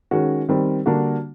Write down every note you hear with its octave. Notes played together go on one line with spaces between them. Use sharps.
D#3 G#3 C#4 F#4
D#3 G3 C4
D3 G3 A#3 D4 F#4